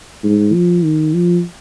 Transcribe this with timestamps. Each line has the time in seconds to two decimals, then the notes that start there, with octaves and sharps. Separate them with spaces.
0.23 G#2
0.53 F3
0.84 D#3
1.14 F3